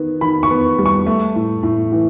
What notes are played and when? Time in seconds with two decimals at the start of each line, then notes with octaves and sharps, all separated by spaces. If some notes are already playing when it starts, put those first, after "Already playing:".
Already playing: D#3 B3
0.21 D#3 B5
0.43 C#6
0.50 B3
0.79 G3
0.86 C#6
1.06 A3
1.36 A2
1.63 A2
1.92 E3